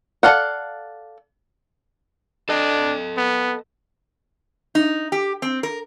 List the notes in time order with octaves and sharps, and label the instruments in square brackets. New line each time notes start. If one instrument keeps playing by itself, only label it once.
[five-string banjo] A4 D5 F5 F#5
[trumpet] D4 [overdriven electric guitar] A4 D#5
[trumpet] B3
[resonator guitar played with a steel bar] D#4
G4
C4
A#4